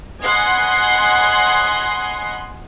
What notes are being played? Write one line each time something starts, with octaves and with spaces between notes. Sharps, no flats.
C#5 D#5 F#5 G#5 B5 C6